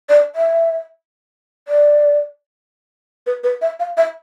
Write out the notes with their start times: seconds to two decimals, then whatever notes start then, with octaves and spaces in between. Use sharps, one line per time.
0.09 D5
0.35 E5
1.68 D5
3.26 B4
3.44 B4
3.62 E5
3.80 F5
3.97 E5